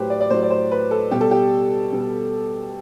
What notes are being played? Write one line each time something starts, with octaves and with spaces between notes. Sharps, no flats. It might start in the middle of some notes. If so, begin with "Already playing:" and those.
Already playing: A2 F#3 G4 B4 C5
D5
D5
A2 F#3 C5
D5
C5
B4
A4
B2 G3 G4
A4
G4
B2 G3